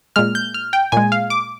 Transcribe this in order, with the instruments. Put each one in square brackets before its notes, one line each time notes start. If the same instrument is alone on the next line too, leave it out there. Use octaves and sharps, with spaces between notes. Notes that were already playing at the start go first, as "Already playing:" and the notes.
[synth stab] A#2 G#3 F6
G6
F6
G5
A#2 G#3 G#5
F5
D6